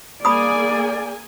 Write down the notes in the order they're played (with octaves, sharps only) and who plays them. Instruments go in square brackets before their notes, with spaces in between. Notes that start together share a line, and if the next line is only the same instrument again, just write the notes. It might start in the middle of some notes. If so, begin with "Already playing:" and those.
[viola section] A#3 G#4 G#5 [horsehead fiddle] D5 [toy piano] B5 D#6